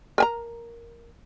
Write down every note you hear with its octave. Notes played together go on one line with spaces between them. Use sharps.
A#4 G#5 A#5